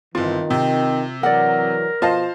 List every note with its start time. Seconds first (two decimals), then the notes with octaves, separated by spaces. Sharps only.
0.15 G1 D#3 E3 C4 F4
0.50 C3 C4
1.23 E3 F#3 A#4 D5 F#5
2.02 B2 F3 F4 C5 D#5 F5 A5